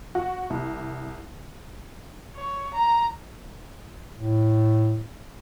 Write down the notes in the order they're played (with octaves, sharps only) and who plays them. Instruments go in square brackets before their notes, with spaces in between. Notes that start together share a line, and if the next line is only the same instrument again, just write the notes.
[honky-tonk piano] F#4
C2
[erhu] C#5
A#5
[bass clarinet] A2